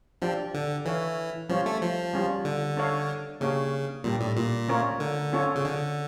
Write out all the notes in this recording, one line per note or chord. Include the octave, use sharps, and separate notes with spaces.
F3 D4 G4 D5 G5
D3
E3 E4 A4 C#5 F5
F3 G3 C#4 F4 C#5
A3
F3
G3 C#4 F4
D3
D4 A4 C#5 F5
C#3 A#3 D4 G4 C#5 F5
A#2 G3 D4 G4 D5
A2
A#2
A3 C#4 F4 A#4 C#5
D3
C#4 F4 A4 C#5
C#3
D3